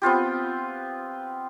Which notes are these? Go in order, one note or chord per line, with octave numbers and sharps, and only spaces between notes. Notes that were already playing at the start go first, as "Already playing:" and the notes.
B3 C4 F4 G4